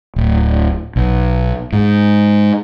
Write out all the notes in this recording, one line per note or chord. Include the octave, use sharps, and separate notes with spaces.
D1
B1
G#2